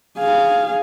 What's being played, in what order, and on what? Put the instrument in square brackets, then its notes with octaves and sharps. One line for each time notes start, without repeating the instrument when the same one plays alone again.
[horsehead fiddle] G#4 F5